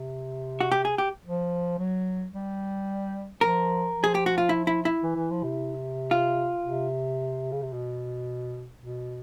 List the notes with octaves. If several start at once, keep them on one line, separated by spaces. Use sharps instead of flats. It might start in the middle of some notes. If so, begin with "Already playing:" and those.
Already playing: C3
F#4
G4
G#4
G4
F3
F#3
G3
F3 A#4
F3
G#4
G4
F#4
F4
E4
E4
E4
E3
E3
F3
C3
F4
C3
C#3
C3
B2
B2